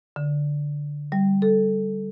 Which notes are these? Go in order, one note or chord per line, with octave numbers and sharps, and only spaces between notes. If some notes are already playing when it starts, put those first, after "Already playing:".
D3
G3
A4